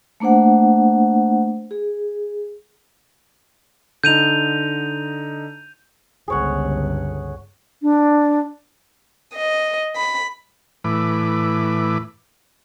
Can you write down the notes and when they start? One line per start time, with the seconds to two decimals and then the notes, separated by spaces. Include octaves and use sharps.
0.20 A3 A#3 D4 C5 F#5
1.71 G#4
4.04 D3 D#4 G6 D#7 F7
6.28 G1 C#2 G#4 C#5 F#5
7.82 D4
9.34 D#5
9.94 B5
10.84 A2 E3 B4 D6